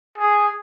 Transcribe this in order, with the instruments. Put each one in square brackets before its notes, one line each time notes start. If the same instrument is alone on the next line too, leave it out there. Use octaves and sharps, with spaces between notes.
[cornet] G#4